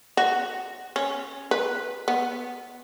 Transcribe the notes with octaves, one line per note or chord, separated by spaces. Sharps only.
F#4
C#4
B4
B3